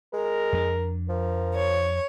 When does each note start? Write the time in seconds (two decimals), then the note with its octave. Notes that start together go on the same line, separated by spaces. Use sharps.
0.13 G#3 A#4
0.53 F2 C4 D4
1.09 F3 A#4
1.55 C#5